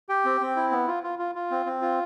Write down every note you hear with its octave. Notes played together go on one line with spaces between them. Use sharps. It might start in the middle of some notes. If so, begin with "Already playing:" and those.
G4 G5
C4
C4
E4
B3
F4
F4
F4
F4
C4
C4
F4